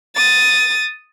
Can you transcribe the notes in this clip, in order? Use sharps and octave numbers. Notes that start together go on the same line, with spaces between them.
D#6 A6